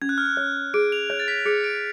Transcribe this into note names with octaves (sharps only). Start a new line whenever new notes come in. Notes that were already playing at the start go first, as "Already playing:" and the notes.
C#4 G#6
F#6
F6
F#6
C#5
G#4 D7
F7
C#5
A6
B6
G#4 C#7
D7